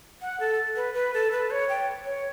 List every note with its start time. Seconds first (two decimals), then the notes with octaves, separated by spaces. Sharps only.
0.22 F#5
0.40 A4
0.76 B4
0.94 B4
1.14 A4
1.32 B4
1.51 C#5
1.69 G5
2.05 C#5